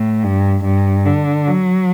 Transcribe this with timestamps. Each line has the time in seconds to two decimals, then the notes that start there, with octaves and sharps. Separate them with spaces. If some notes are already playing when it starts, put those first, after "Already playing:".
Already playing: A2
0.23 G2
0.64 G2
1.06 D3
1.48 F#3